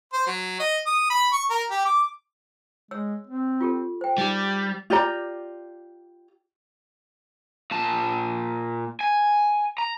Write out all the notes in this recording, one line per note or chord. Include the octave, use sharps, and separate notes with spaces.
C5
F#3
D#5
D#6
B5
C#6
A#4
G4
D6
G#3 C#5 E6
C4
F4 G4 A4
C5 G5
G3 D#4 G4 G#4
F4 G4 D5 A#5
A#2 A5
G#5
A#5